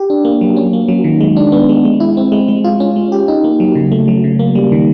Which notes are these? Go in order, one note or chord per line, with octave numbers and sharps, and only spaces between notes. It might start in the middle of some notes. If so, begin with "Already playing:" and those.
Already playing: G4
D4
A#3
F#3
C#4
A#3
F#3
D#3
G#3
D4
B3
G#3
G#3
E4
C4
G#3
G#3
F4
C#4
G#3
G4
D#4
A#3
F#3
C#3
A3
F#3
C#3
A#3
G3
D#3